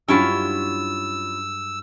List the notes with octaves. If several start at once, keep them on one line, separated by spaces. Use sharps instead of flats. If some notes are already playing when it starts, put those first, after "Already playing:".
G2 F#3 C#4 E4 F4 E6